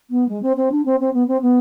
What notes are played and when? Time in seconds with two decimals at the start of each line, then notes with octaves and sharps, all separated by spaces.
0.10 B3
0.28 G#3
0.42 C4
0.56 C4
0.71 D4
0.85 C4
1.00 C4
1.13 B3
1.27 C4
1.41 B3